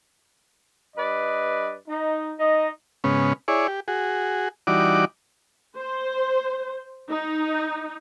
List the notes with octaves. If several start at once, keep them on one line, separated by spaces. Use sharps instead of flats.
G2 B4 D5 D#5
D#4
D#4 D#5
G#2 C#3 B3 C#4
E4 G#4 C#5 D5
G4
F#4 G#4
E3 G3 D#4 F#4 D5 D6
C5
D#4